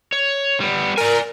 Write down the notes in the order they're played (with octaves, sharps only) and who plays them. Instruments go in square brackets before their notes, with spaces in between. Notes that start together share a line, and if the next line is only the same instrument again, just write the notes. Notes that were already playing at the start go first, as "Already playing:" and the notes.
[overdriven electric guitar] C#5
G3 B3
[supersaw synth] A#4 [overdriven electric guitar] D5 G#5